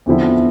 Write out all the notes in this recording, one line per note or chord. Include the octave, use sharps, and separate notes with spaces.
E2 D3 F3 C4 E4